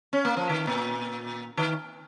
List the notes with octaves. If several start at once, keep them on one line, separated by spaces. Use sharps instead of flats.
C#4
A#3
F3
D#3
A#2
D#3